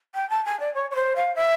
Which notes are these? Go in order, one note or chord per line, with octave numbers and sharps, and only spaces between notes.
G5
A5
G#5
D5
C#5
C#5
C5
F5
E5